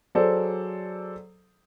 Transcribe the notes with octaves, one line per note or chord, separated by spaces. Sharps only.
F#3 G#4 A4 C5 D5